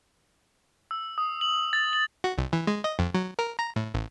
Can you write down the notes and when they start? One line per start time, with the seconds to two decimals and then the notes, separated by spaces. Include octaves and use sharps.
0.91 E6
1.18 D#6
1.41 F#7
1.73 A6
1.93 F#7
2.24 F#4
2.38 C2
2.53 E3
2.67 G#3
2.84 D#5
2.99 F2
3.14 F#3
3.39 A#4
3.59 A#5
3.76 A2
3.94 A1